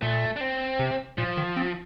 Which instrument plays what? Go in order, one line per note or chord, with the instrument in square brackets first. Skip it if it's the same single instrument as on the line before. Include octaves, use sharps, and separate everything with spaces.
[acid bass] A#2 [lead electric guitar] A3
[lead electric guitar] D4
C4
[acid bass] C3
[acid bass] A#2 [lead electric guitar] F3
[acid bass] D#3
C4